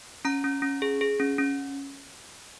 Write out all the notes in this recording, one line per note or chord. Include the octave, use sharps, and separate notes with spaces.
C#4 A#5
C#4
C#4
G#4
G#4
C#4
C#4